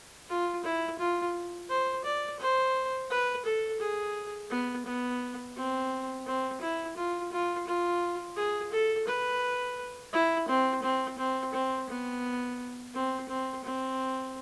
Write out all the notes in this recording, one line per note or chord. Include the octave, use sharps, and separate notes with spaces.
F4
E4
F4
C5
D5
C5
B4
A4
G#4
B3
B3
C4
C4
E4
F4
F4
F4
G#4
A4
B4
E4
C4
C4
C4
C4
B3
C4
C4
C4